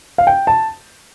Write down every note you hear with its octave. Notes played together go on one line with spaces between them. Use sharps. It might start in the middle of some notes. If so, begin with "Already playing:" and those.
F5
G5
A5